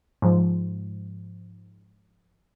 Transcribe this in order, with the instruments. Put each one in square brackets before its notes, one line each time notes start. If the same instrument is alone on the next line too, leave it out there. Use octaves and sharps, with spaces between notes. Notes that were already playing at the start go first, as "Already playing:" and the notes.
[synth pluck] G#2 F3